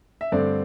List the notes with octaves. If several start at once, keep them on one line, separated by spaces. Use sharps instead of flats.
E5
G2 D3 A3 C4 D5